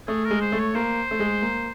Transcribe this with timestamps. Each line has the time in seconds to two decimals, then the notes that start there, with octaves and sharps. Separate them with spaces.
0.08 A3 G#4
0.25 A#4
0.31 G#3
0.41 C5
0.52 A3
0.59 C#5
0.75 A#3 C5
1.11 A3
1.20 G#3
1.42 A#3